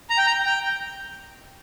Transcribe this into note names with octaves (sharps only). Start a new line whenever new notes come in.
A#5
G5
A#5
G5